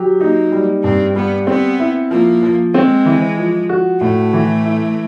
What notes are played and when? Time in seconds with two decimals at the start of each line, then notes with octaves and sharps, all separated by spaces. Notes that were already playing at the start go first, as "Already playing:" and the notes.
Already playing: F#3 G4
0.20 A#3 D#4
0.52 G3
0.83 G2 C4
1.15 G3 B3
1.47 B3 C4
1.79 E4
2.11 F3 A#3
2.43 F3
2.74 G#3 C4
3.06 E3
3.38 F3
3.69 F#4
4.01 A2 A3
4.33 E3
4.65 E4